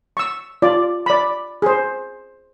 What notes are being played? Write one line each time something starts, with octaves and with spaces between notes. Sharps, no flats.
C#6 E6
F4 D5
D5 B5
G#4 C5